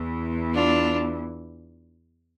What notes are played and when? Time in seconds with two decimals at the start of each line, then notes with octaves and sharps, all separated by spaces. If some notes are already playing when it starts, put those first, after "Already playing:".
Already playing: E2 E3
0.54 D4 F4